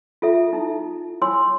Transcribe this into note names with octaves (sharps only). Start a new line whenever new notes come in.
F4 A4 E5
D#4 E4
E4 C#5 G#5 C6 E6